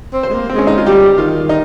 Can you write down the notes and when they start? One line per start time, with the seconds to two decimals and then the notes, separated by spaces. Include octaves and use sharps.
0.13 C4
0.23 C5
0.30 G#3
0.34 A#3
0.50 C4
0.55 G#3 C#4
0.67 D#4
0.78 F4
0.86 G3 G4
1.18 D#3 F4
1.49 D#4